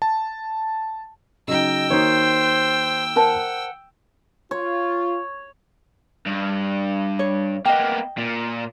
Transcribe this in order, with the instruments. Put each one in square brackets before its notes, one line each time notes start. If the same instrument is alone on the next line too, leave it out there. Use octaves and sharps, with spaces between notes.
[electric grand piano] A5
[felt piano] C#3 F#3 D#4 [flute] D#5 [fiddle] G5 E6
[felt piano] D#3 A#3 F#4 [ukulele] D#4 C#5 [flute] C5
[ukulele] A#4 C5 A5 [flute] F#5
[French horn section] F4 [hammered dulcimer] C#5
[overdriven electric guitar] G2
[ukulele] C#5
[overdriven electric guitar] A#3 B3 [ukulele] D#5 G5
[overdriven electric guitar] A#2